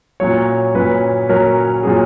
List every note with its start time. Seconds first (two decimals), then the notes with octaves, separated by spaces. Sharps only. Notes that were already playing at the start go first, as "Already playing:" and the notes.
0.20 A#2 F#3 C#4 C#5
0.75 A#2 F#3 C#4 B4
1.29 A#2 F#3 C#4 A#4
1.83 A#2 F#3 C#4 G#4